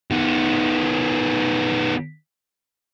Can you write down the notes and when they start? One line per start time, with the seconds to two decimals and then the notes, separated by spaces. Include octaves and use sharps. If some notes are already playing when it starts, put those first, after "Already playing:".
0.11 D#3 B3